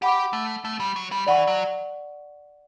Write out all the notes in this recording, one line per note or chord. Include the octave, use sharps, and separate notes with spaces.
G4 F#5 B5 D6
A3
A3
G3
F#3
G3
E3 D5 F#5 C#6
F#3